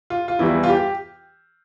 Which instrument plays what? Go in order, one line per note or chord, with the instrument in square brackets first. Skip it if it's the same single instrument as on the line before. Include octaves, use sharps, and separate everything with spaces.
[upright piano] F4
F4
E2 E3 G3 E4
F4
G4